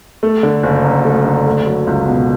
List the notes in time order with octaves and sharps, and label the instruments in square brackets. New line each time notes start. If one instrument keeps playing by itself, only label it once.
[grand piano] A3
D3
F#1
F#2
A3
D3
A3
F#3
C#2
B2